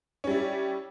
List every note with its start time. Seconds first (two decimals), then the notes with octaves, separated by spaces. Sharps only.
0.24 C#4
0.27 G3
0.30 E4